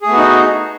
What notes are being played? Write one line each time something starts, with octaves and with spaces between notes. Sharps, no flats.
A3 B3 D#4 F#4 G#4